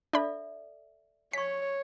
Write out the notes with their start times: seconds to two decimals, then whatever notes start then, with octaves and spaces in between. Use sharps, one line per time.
0.13 D4 A4 D5 E5 B5
1.33 C#5 G#5 C#6 B6